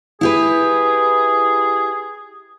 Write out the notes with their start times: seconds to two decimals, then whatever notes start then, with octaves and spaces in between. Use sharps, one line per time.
0.21 E4 G4 G#4 B4